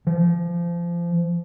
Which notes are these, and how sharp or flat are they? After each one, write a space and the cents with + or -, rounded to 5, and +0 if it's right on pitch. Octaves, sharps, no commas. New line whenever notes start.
F3 -25